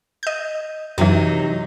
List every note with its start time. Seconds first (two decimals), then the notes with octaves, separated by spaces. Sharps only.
0.23 D#5 G6
0.98 F#2 C3 E3 F#3 D#4